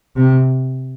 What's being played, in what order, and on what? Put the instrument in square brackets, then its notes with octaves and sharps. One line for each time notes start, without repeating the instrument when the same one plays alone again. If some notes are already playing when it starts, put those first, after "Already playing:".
[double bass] C3